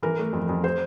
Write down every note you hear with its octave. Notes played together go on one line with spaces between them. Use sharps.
E3 A#4
A3
F2
F2
C5